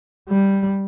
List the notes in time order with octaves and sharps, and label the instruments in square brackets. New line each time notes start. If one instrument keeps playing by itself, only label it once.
[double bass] G3